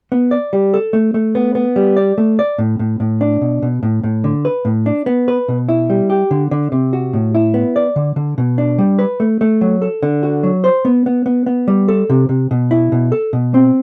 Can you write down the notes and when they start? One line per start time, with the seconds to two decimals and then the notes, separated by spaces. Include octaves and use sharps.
0.12 B3
0.31 D5
0.53 G3
0.74 A4
0.93 A3
1.14 A3
1.35 B3
1.55 B3
1.76 G3
1.96 D5
2.18 A3
2.39 D5
2.58 A2
2.79 A2
3.00 A2
3.21 D4
3.41 B2
3.62 B2
3.83 A2
4.03 A2
4.24 D3
4.45 B4
4.65 A2
4.86 D4
5.06 B3
5.28 B4
5.48 B2
5.69 E4
5.90 G3
6.10 G4
6.31 D3
6.51 D3
6.72 C3
6.93 F#4
7.13 A2
7.35 E4
7.54 B3
7.76 D5
7.96 D3
8.16 D3
8.38 B2
8.58 D4
8.78 G3
8.99 B4
9.20 A3
9.41 A3
9.61 F#3
9.82 A4
10.03 D3
10.23 F#4
10.43 F#3
10.64 C5
10.85 B3
11.06 B3
11.26 B3
11.46 B3
11.68 G3
11.88 A4
12.10 C3
12.29 C3
12.51 B2
12.71 E4
12.92 B2
13.12 A4
13.33 B2
13.54 C4